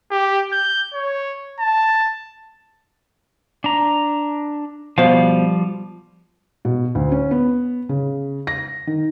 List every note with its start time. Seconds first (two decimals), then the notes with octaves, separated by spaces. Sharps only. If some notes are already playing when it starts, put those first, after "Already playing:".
0.11 G4
0.52 G6
0.94 C#5
1.60 A5
3.64 D4 A#5
4.98 B2 F3 G3 C5 F5
6.65 B2
6.95 D2
7.12 C#4
7.31 B3
7.89 C#3
8.47 A#6
8.87 D#3